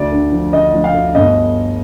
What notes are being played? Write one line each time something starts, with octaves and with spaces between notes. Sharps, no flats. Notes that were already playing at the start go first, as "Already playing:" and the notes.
Already playing: D2 D3 D5
D3
F3
D3 D#5
F3
F5
D2
G1 D#5